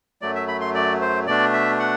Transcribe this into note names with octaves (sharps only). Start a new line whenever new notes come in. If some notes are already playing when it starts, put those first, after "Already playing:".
F#2 F#3 A3 D5
E5
B5
C6
D5
C5
B2 A3 D4 D5
E5
F#5